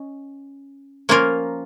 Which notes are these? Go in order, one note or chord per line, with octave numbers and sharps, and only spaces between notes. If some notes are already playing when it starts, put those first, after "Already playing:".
Already playing: C#4 D#5
F3 A#3 C#4 F4 A#4